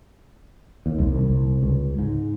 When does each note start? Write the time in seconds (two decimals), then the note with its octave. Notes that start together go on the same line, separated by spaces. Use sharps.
0.86 D#2
0.99 C2
1.23 C2
1.63 C#2
1.99 G#2